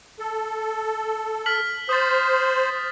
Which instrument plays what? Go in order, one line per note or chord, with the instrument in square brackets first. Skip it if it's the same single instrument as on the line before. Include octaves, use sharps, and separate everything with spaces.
[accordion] A4
[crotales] F6 B6 F#7
[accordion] C5 [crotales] D#6 A6